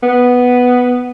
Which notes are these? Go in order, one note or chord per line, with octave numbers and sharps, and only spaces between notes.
B3